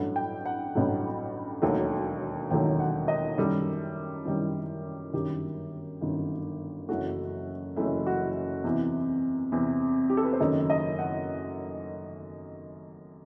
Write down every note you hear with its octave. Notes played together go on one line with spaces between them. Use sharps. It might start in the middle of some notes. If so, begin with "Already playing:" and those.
Already playing: A1 G2 F#3 A3 F#5
G5
F#5
A1 G2 F#3 A3
E1 D#2 D#3 F#3 A3
E1 D#2 D#3 F#3 A3 G5
F#5
D#5
F#2 D#3 G3 A4
F#2 D#3 G3
G1 F#2 D#3 G4
G1 F#2 D#3
F#1 F#2 E3 A3 F#4
F#1 F#2 E3 A3 E4
F#4
E2 C3 E3
E2 C3 E3
G4
A4
B4
C5
F#1 F#2 D#3 A3 D#5
D#5
F#5